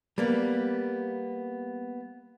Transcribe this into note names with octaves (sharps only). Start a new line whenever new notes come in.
G3 A#3 B3